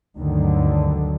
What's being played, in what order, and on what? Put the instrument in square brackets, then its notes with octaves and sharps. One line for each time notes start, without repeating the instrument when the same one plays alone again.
[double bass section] D2 G2 D3 D#3 F#3